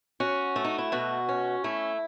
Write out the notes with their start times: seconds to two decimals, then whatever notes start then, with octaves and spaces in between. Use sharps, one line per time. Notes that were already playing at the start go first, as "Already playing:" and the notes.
0.20 C#4 F#4
0.56 A3
0.65 D#4
0.78 E4
0.92 B2 F#4
1.29 C#4
1.64 A3 E4